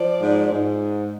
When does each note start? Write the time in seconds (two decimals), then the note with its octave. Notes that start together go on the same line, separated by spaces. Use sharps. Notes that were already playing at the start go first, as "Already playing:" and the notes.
Already playing: F3 D5
0.21 G#2
0.52 G#2